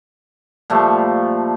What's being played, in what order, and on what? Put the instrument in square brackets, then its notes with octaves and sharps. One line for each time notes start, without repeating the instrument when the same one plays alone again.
[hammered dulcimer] A#2 F3 G3 A3